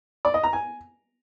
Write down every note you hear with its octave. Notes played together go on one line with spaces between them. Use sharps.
D5
D#5
A#5
G#5